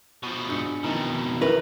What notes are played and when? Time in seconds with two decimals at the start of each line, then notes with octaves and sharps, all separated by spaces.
0.23 B2 F3
0.49 G#2 D4 C#7
0.84 F2 B2 D#3 E3 D#4 A#5
1.41 E2 D#3 C#4 E4 A#4 B4